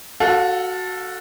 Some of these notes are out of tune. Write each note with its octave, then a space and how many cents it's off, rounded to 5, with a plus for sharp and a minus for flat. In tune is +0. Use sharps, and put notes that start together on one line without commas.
F#4 +0 A4 +0 F5 +35